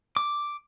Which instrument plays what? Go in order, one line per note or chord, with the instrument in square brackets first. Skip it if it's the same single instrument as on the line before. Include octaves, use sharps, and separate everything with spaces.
[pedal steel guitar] D6